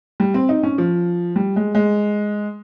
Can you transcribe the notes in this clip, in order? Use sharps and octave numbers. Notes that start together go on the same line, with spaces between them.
G3
C4
D#4
C#4
F3
G3
G#3
G#3